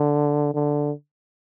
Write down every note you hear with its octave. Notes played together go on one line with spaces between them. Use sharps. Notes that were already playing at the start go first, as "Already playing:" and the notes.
Already playing: D3
D3